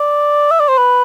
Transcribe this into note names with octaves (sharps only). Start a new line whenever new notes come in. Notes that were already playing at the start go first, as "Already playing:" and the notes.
Already playing: D5
E5
D5
C5
B4